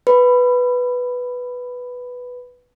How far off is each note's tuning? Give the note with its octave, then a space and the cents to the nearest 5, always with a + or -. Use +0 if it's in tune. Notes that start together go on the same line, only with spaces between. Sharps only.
B4 +0 B5 +10